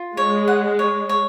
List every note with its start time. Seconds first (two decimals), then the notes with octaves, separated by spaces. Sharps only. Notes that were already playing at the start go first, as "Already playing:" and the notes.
Already playing: F4
0.17 G#3 C#5
0.48 F#5
0.79 C#5
1.09 C#5